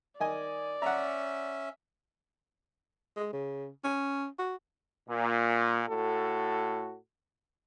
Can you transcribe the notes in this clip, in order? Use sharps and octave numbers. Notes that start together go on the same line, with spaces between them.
D#3 D5 D#5 G#5
C#4 E5 F#5 A#5
G#3
C#3
C#4
F#4
A#2
A2 F#4 A4